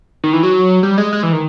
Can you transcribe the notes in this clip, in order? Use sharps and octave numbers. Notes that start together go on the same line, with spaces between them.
D#3
E3
F#3
G3
G#3
G#3
E3
D#3